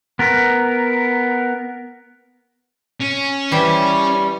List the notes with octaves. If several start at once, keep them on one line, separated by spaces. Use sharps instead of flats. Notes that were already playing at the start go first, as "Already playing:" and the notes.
B3 A#4
C#4
E3 G3 G4 C5